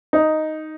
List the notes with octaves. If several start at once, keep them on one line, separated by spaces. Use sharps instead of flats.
D#4